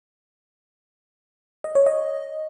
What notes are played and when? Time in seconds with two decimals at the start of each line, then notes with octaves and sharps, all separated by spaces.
1.64 D#5
1.75 C#5
1.86 D#5